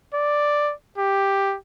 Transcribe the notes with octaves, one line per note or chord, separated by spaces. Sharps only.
D5
G4